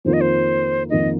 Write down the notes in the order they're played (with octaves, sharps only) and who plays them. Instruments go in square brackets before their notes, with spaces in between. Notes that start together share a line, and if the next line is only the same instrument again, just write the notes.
[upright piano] F2 D#3 A#3 F4 [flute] C5
[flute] D#5
C5
[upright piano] F2 D#3 A#3 F4 [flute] D#5